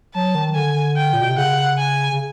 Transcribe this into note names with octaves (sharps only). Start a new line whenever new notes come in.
F#3 A5
D#3
D3 G#5
G5
A#2
B2
C3
C#3 F#5
G#5
C#3